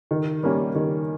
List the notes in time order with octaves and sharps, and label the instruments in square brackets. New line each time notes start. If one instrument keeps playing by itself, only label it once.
[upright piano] D#3
G3 A#3 C#4
D#3